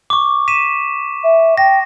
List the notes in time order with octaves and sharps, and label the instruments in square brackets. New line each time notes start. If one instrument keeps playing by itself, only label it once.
[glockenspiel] C#6 D6
B6 D#7 E7
[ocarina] E5
[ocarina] G5 [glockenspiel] A#6